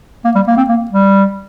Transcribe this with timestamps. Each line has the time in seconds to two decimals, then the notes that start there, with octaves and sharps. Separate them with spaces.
0.25 A#3
0.35 G3
0.47 A#3
0.57 C4
0.69 A#3
0.91 G3